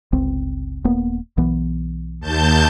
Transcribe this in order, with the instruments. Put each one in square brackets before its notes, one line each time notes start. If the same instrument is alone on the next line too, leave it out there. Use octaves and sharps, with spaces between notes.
[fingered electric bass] G1 C#2 C4
D#1 A#3 B3
B1 E3 B3
[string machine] D#2 A5 G6